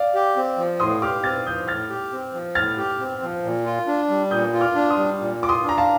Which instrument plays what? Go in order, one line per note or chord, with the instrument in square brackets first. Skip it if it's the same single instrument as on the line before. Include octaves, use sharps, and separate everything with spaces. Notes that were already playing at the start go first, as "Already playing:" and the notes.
Already playing: [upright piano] D5 F5
[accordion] G4
C4
F3
[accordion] A2 [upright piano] C6 D#6
[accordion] G4 [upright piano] D6 F6
[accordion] C4 [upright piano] F6 A6
[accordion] F3 [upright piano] D#6 G6
[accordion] A2 [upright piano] F6 A6
[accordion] G4
C4
F3
[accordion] A2 [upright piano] F6 A6
[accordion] G4
C4
F3
A#2
F4
D4
G3
[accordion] A#2 [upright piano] D#6 G6
[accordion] F4
[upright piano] D6 F6
[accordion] D4
[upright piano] C6 D#6
[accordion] G3
A#2
[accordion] F4 [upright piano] D6
[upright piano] C6 D#6
[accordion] D4 [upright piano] A#5
[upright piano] F5 A5